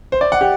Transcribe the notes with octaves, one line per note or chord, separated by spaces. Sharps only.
C5
D5
F#5
G4